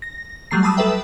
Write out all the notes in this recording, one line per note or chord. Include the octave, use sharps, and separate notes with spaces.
A#6
F#3 G3 A3 A#5 C7
A5 B5 D#6 E6
A4 B4 E5 G5